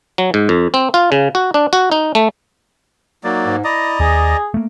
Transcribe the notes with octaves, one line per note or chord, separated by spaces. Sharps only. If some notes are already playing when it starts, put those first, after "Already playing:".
F#3
G#2
F2
C4
F4
C#3
F#4
D4
F#4
D#4
A3
F#3 A#3 D#4 D5
G#2
E4 D5 D#5 A#5
D#2 G#4
A3 A#3